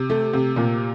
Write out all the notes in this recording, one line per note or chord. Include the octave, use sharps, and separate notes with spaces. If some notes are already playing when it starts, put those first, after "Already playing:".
Already playing: C3
A3
C3
A#2